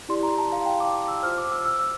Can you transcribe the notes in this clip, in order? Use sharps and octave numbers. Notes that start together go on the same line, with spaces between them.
E4 G4 D5 C6
A#5
A5
F5
G5
D6
D6
E6
F4 C5 F6
D6
E6
E6